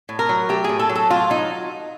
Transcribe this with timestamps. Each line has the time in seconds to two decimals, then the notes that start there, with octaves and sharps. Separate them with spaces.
0.09 A2
0.19 A#4
0.29 F#3
0.49 A3 G4
0.64 A2 G#4
0.79 A4
0.89 F#3
0.95 A4
1.10 A2 F4
1.30 F#3 D#4